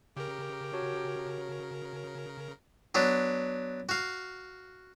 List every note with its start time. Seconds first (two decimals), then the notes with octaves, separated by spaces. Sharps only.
0.17 C#3 G4 A#4
0.73 F#4 C#5 A5
2.95 F#3 B3 D4
3.89 F#4 F5